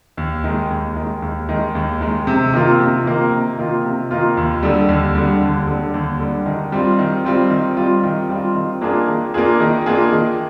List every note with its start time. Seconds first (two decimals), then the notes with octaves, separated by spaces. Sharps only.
0.17 D#2
0.44 D#3 G#3
0.70 D#2
0.96 D#3 G#3
1.22 D#2
1.49 D#3 G#3
1.75 D#2
2.01 D#3 G#3
2.27 C3
2.53 D#3 A#3 F4
2.80 C3
3.05 D#3 A#3 F4
3.31 C3
3.58 D#3 A#3 F4
3.84 C3
4.11 D#3 A#3 F4
4.37 D#2
4.63 D3 G3
4.89 D#2
5.15 D3 G3
5.41 D#2
5.67 D3 G3
5.94 D#2
6.19 D3 G3
6.46 D#3
6.72 G3 C4 F4
6.99 D#3
7.25 G3 C4 F4
7.50 D#3
7.77 G3 C4 F4
8.04 D#3
8.29 G3 C4 F4
8.55 D#3
8.81 A#3 D4 F4 G#4
9.07 D#3
9.34 A#3 D4 F4 G#4
9.60 D#3
9.86 A#3 D4 F4 G#4
10.12 D#3